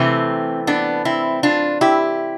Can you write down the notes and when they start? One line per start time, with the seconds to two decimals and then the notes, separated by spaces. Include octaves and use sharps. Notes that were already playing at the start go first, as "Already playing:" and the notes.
Already playing: C3 E3 A3 C4
0.67 B3 D4
1.05 C4 E4
1.43 D4 F4
1.81 E4 G4